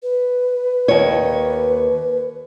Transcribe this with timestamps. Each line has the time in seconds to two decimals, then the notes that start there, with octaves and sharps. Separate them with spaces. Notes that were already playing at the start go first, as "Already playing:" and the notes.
0.03 B4
0.88 D#2 C#5